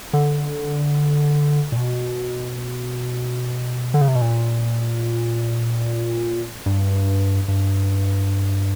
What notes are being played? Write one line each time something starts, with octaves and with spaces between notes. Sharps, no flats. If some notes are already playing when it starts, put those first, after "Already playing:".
D3
A#2
B2
D3
C#3
C3
B2
A#2
G2
G2